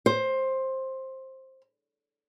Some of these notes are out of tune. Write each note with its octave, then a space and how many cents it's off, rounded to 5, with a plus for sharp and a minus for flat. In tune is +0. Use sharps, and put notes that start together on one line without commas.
C5 +15